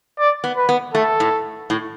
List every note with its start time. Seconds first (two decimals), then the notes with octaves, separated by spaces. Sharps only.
0.19 D5
0.44 B3
0.57 B4
0.69 B3
0.94 A3 A4
1.20 A2
1.70 A2